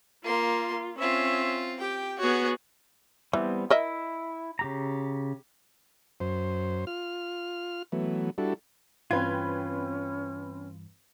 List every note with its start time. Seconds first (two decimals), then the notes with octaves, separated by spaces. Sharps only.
0.24 A#3 F4 C6
0.98 C4 C#4 F4 E5
1.80 G4 G5
2.19 B3 F#4 G#4 C#5
3.33 E3 G3 B3 C4
3.70 E4 A#4 D#5 E5
4.59 C#3 G4 A#5
6.20 F#2 C5
6.87 F4 F6
7.92 E3 F#3 A3 B3
8.38 G3 D4 E4 F#4 A4
9.11 G2 E3 G3 C4 C#4 F4 B4 G#6